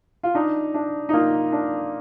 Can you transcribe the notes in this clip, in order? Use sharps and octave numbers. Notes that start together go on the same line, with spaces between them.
F4
D4 D#4
D4
D#4
A#3 F4
D4